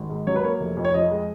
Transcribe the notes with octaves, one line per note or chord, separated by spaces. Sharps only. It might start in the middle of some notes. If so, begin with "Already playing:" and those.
Already playing: G#1
G#2
F#3 C#5
B4
A#3 C#5
F1
F2
C#5
F3 D#5
G#3